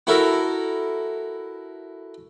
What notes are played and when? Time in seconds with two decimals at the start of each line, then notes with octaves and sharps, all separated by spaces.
0.07 E4 F#4 A4 A#4 E5